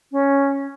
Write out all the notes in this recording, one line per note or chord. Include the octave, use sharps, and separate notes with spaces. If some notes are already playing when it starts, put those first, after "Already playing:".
C#4